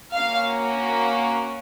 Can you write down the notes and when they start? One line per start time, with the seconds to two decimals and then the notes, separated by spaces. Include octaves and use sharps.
0.14 A#3 C#4 F#4 F5